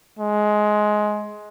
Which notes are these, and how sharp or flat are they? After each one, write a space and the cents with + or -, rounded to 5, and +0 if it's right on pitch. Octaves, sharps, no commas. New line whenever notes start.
G#3 +15